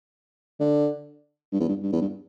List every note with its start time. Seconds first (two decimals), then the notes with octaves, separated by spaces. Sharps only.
0.60 D3
1.53 G2
1.60 E2
1.69 G2
1.83 G2
1.93 E2
2.01 G2